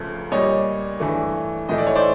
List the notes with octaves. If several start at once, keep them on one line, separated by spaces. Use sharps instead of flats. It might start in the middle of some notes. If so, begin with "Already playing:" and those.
Already playing: C#2 C#3 F3 A3
A#2 G3 C#5 D#5
G2 E3 A3
A2 E3 A3 D#5
D5
C#5
C5 D5